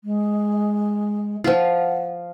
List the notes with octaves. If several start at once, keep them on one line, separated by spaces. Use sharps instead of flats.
G#3
F3 F4 F#5